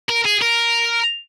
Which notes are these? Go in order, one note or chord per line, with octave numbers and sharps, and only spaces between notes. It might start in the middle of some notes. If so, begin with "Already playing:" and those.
A#4
G#4
A#4